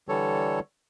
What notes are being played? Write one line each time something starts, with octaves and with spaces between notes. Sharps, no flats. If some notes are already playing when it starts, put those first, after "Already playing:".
D3 E3 G3 A4 C#5